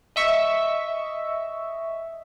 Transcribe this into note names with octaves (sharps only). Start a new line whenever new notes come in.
D#5 E5 C#6